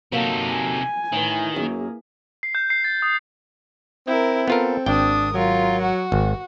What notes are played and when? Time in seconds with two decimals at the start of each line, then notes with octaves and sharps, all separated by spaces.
0.12 C3 F#3 A#3 D#4 A4
0.51 G#5
1.12 A2 D#3 E3
1.56 F#2 A#3 G#4
2.43 C7
2.55 G6
2.70 C7
2.84 A6
3.02 D#6
4.07 C4 E4 A#4
4.48 B3 F4 A4 A#4
4.86 G#1 D4 G5 D#6
5.34 F#3 F4 A#4
5.83 F#4
6.12 G#1